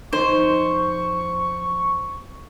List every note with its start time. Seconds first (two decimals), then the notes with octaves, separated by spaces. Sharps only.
0.13 F2 D#4 C5 C#6